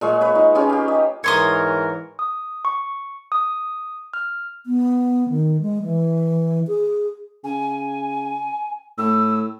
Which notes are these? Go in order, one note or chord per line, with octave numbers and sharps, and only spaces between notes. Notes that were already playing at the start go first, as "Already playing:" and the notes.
A#2 G#3 F5 C#6
B4 C#5
D#4
C#4 F4 G4 G#4
G4 F5
D#5
G#2 E3 A#4 C#5 C6 D#6
D#6
C#6
D#6
F6
B3
D#3
G#3
E3
G#4
C#3 G#5
A2 E6